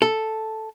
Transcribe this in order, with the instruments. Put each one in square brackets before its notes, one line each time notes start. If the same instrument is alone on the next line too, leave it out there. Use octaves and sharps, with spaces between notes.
[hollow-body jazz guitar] A4